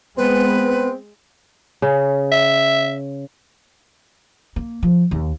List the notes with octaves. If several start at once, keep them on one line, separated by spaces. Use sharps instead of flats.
G#3 B3 C4 B4
C#3
E5
A#3
F3
D#2